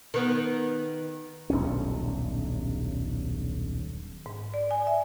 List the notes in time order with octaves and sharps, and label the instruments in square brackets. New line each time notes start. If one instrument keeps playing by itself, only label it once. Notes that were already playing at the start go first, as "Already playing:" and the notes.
[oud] D#3 B3
[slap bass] D#1 B1 G2 C#4
[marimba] G#2
D5
G#5
E5